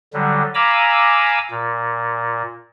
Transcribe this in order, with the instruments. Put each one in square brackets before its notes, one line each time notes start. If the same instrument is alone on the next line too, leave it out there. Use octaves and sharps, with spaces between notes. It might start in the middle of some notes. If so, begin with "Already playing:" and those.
[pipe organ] D3 F#3 G3
F5 G#5 A#5 B5 D6 E6
A#2